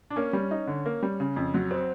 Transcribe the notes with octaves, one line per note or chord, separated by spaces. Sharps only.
D4
A#3 C#4
G3
D#4
D3
A#3
G3
C#3
F2
F#3
C4